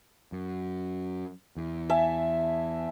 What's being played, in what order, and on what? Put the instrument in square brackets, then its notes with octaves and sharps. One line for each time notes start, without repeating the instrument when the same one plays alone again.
[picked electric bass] F#2
E2
[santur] E5 G#5 A5